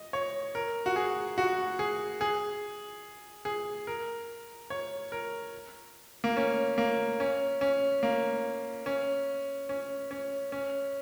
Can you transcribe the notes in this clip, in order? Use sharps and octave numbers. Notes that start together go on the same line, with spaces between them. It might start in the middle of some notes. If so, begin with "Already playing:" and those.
Already playing: D#5
C#5
A#4
F#4
G#4
F#4
G#4
G#4
G#4
A#4
C#5
A#4
A#3
C#4
A#3
C#4
C#4
A#3
C#4
C#4
C#4
C#4